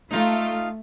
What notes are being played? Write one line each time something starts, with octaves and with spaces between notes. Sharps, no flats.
A3 D#4 F4